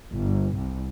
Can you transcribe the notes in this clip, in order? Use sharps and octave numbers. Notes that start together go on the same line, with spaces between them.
G1
C2